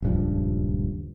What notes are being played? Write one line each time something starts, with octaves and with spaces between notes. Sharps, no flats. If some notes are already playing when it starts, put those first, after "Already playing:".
D#1 C#2 G2 F3